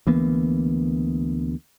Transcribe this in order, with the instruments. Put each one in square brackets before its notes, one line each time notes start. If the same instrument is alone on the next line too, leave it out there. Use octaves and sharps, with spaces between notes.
[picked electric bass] D2 E3 A#3 B3